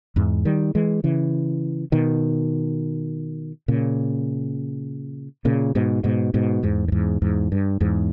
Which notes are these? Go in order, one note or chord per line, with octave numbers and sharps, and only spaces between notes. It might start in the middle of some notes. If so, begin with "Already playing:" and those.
E2 G#2
D#3 G3
E3 G#3
C#3 E3
B2 D#3
A#2 C#3
A#2 C#3
G#2 B2
G#2 B2
G#2 B2
E2 G#2
G2
E2 G#2
E2 G#2
G2
E2 G#2